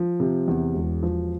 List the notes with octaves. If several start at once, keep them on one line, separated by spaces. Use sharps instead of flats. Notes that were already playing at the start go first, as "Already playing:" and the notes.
Already playing: F3
C3
E2
E1
F3